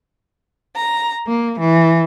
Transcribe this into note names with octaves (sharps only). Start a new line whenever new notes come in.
A#5
A#3
E3